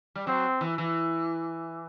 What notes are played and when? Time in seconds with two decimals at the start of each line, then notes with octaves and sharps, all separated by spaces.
0.15 G3
0.27 F#3 C4
0.61 E3
0.78 E3